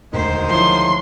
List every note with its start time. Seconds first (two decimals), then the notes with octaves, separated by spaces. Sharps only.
0.13 E1 D2 D#3 G#3 C5
0.50 F3 E4 C#5 C6